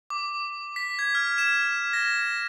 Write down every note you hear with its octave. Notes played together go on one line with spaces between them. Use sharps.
D6
B6
G#6
F6
E7
A#6